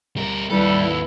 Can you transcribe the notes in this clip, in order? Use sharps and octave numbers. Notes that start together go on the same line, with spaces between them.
G3 A#4
D#2 G3 E4 A4 B4